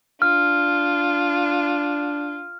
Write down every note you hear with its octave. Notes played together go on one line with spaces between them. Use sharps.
D4 F4 F6